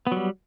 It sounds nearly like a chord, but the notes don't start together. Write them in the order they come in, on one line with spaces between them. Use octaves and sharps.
B3 F#3 G3